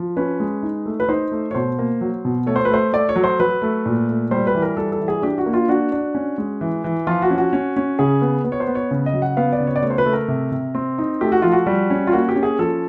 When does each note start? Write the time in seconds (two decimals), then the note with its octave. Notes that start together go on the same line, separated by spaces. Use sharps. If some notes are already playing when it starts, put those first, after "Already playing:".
Already playing: F3
0.17 C#4 B4
0.40 G#3
0.63 D#4
0.86 A3
1.00 B4
1.09 D#4 C5
1.32 A3
1.51 C#5
1.55 B2 C5
1.79 A#3
2.01 F#3
2.25 B2
2.46 A3 C#5
2.56 C5
2.65 B4
2.70 A3 C5
2.93 A3 D5
3.09 C#5
3.16 F#3
3.24 C5
3.40 F#3 B4
3.62 A3
3.86 A#2
4.09 A3
4.31 G3 C5
4.47 B4
4.55 E3
4.62 A#4
4.77 G3 A4
4.92 A4
5.00 E3
5.08 G#4
5.22 D4 G4
5.38 F#4
5.46 A#3
5.53 F4
5.68 D4 F#4
5.92 D4
6.15 C#4
6.38 G#3
6.61 E3
6.84 E3
7.07 F3 F4
7.22 F#4
7.30 C#4
7.38 F#4
7.53 C#4
7.76 C#4
7.99 C#3 G#4
8.22 B3
8.45 B3
8.52 C#5
8.60 C5
8.67 B3
8.75 C#5
8.91 C#3
9.06 D#5
9.13 F#3
9.22 F#5
9.37 B3 F5
9.53 D5
9.60 C#3
9.67 C#5
9.76 D5
9.83 A3 C#5
9.90 C5
9.98 B4
10.05 A3
10.13 A#4
10.28 C3
10.52 C3
10.75 C4
10.98 D#4
11.21 A3 G4
11.32 F#4
11.42 F3 F4
11.52 F#4
11.67 G3
11.90 C#4
12.07 F4
12.13 A#3 F#4
12.29 G4
12.36 C#4
12.43 G#4
12.59 F3 A4